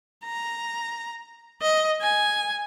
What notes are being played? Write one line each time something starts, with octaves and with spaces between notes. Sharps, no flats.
A#5
D#5
G#5